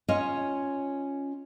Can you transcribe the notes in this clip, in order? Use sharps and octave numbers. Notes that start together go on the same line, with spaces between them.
C#4 F4 C#5 D#5